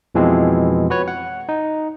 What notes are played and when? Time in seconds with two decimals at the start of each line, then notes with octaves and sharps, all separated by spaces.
0.15 F2 B2 E3 F3 G#3 C4
0.90 F#4 B4 C#5
1.08 F#5
1.49 D#4